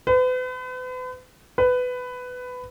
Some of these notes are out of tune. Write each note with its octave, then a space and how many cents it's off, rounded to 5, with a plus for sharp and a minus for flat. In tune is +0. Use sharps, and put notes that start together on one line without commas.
B4 +40
B4 +15